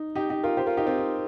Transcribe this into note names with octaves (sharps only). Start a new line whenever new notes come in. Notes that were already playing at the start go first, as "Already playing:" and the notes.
Already playing: D#4
D#4 G4
D#4 G4
F4 A#4
G4 C5
F4 A#4
D#4 G4
C4 F4
D#4